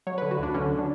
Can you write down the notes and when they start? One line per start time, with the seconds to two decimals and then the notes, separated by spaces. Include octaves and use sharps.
0.07 F#3 C#5
0.18 B4
0.22 D3
0.31 F#4
0.39 D2 D4
0.54 D3 C#4
0.79 D4